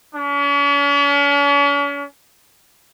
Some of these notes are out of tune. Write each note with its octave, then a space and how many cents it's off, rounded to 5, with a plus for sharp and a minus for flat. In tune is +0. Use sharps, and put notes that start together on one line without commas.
C#4 +45